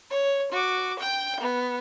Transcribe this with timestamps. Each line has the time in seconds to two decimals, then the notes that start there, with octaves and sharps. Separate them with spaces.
0.10 C#5
0.52 F#4 D6
0.99 G5 G6
1.40 B3